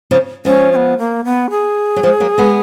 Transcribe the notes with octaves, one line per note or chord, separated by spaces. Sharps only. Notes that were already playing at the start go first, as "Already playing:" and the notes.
C#3 F3
F3 G#3 C#4
C#4
B3
A#3
B3
G#4
F#3
F3 G#3
F#3 A#3
G#3 B3